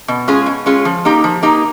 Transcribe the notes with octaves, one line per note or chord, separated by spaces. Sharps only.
B2
G#3 C#4 F4 G#4
B2
G#3 C#4 F4 G#4
F3
A#3 D#4 G4
F3
A#3 D#4 G4